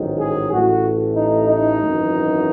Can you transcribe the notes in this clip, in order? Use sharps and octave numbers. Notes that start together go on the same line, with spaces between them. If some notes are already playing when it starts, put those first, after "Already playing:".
Already playing: A1 G#2 D#3 F#3
G#4
A1 A2 E3 A3 F#4
D#4
D#4
G#1 F#2 E3